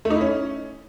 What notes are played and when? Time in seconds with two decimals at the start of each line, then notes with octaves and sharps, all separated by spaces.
0.05 A3
0.10 D#4
0.16 E4
0.21 C#4